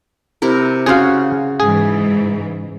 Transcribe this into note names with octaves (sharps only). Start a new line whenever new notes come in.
C3 E4 A#4
C#3 F#4 G#4 C5 F5
G#2 E3 G#4